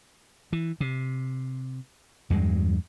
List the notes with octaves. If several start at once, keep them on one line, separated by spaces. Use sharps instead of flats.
E3
C3
E2 G2 F#3 G#3